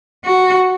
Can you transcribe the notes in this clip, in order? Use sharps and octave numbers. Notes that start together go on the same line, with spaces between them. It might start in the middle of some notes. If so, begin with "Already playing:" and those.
F#4